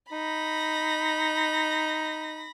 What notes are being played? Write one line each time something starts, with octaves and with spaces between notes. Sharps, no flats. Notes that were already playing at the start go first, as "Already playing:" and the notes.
D#4 B5 A#6